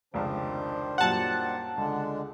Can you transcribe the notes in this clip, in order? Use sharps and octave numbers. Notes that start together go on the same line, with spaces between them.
F1 C#2 D#3 D4 C5
F#2 A#2 G3 F#5 A5
C#2 D3 G#3 D4